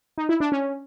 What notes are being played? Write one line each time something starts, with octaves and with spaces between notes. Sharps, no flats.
D#4
E4
D4
C#4